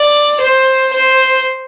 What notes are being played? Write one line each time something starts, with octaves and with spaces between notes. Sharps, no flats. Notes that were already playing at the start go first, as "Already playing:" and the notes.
Already playing: D5
C5
C5